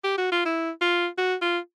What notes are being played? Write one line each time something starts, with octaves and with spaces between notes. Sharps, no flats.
G4
F#4
F4
E4
F4
F#4
F4